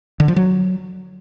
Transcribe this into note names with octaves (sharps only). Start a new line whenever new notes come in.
D3
F3
F#3